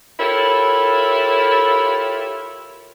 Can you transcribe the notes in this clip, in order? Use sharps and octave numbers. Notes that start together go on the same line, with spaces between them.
E4 F4 G4 A4 A#4 C#5